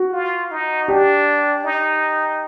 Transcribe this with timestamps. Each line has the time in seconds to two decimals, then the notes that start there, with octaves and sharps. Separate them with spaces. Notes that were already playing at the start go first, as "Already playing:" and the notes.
Already playing: F#4
0.12 F4
0.51 D#4
0.88 D4 G4
1.64 D#4